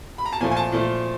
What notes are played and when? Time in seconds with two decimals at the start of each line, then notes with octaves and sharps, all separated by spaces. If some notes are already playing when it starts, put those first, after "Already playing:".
0.18 B5
0.26 A#5
0.33 A5
0.40 A#2 F3 A3 G#5
0.51 G#5
0.57 A5
0.72 A#2 F3 A3